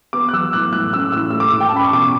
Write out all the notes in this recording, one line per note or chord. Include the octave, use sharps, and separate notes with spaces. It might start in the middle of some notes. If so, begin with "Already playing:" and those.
B3 D6
F#6
F#3 E6
A2 F#6
A2 F#6
C#4 E6
A2 E6
A3 E6
D6
A2
G5
A5
C#4 B5
C#6
B2 D6